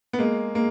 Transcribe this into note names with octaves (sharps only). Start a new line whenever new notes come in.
B3
G#3 A#3
G#3 A#3